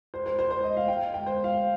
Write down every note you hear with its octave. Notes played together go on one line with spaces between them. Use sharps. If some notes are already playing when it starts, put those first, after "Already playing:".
C5
C5
C5
C5
D#5
F5
G5
G5
C5
F5